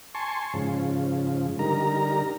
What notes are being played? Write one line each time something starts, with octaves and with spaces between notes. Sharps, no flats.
G#5 A5 C6 C#6
G#2 C#3 F3
D3 G3 D#4 A#4 A#5